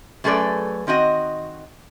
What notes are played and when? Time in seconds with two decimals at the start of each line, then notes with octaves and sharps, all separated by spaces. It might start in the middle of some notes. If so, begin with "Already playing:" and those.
0.24 F#2 A3 G#4 A4 B4 D5
0.87 D#3 C4 F#4 D#5